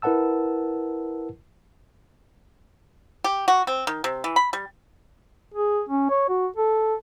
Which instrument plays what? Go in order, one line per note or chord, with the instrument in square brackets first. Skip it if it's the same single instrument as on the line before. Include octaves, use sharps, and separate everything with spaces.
[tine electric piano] E4 A#4 B4 F#5 A5 E6
[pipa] G4
F#4
C4
D#3
C3
E3
B5
G3
[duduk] G#4
C#4
C#5
F#4
A4